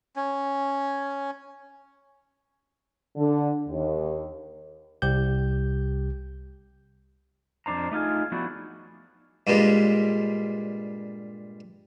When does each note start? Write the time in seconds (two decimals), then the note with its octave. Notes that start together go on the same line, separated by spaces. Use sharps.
0.16 C#4
3.16 D3
3.68 D#2
5.02 C2 G4 G6
7.66 F2 A#2 D4 C5 A#5
7.92 A3 D#4 F4 G#4
8.32 F3 A3 B3 D4 E4 F#4
9.47 G2 A#2 G3 G#3